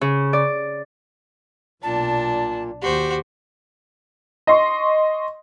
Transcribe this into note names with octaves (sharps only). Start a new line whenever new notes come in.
C#3
D5
B1 A#2 D4 A5
D#2 F#4 G4 C5
D#5 C6 C#6